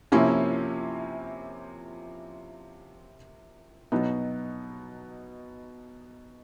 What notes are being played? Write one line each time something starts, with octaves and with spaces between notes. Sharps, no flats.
C3 F3 A#3 C#4 E4
B2 F#3 B3 D#4